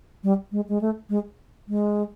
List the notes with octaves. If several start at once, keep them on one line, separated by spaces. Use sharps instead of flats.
G3
G#3
G#3
A3
G#3
G#3